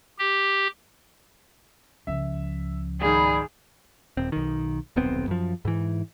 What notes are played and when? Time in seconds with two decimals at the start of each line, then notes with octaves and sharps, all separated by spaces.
0.19 G4
2.07 C#2 F3 E5
3.01 G#2 D#3 G#4 D5 B5
4.17 D#1 C4
4.32 B1 D#3
4.96 D#1 B1 B3 C4
5.27 F#2 F3
5.65 G#2 E3